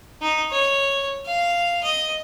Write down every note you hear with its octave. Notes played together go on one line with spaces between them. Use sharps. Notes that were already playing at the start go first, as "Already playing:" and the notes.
D#4
C#5
F5
D#5